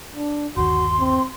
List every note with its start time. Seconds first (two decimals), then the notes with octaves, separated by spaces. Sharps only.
0.16 D4
0.57 G1 D#2 F#4 C6
1.00 C4